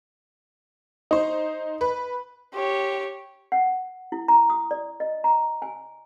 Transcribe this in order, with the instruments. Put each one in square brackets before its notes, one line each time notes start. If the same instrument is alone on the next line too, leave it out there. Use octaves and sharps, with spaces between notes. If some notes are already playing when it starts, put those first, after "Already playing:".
[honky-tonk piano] D#4 C5 [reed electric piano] D#5
[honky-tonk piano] B4
[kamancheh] G4 C#5
[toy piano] F#5
E4
A#5
D#6
D5
D#5
A#5
G#5